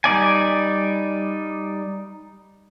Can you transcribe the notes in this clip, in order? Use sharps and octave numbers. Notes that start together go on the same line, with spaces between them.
G3 D#4 D5 G#5